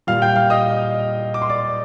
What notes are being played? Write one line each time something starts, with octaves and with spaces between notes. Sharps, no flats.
A#2 G3 F5 F6
G5 G6
F5 F6
D#5 D#6
D6
C6
D5 D6